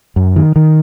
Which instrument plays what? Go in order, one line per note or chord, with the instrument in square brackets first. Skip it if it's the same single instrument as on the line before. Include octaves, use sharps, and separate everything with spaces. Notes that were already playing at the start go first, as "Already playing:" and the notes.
[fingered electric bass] F#2
D#3
D#3